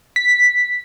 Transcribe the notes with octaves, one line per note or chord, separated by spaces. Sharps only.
B6